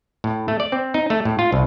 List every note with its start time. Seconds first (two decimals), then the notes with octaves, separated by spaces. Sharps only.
0.24 A2
0.48 A3
0.60 D5
0.72 C4
0.94 D#4
1.10 A3
1.25 A2
1.39 F4
1.52 C2